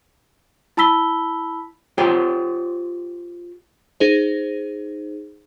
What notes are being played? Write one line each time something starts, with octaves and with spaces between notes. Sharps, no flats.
E4 A5 B5 E6 B6 G7
F4 G4 C5 C#5 G5
D#4 G#4 C5